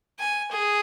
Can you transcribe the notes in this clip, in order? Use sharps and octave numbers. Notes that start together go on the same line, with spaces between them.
G#5
G#4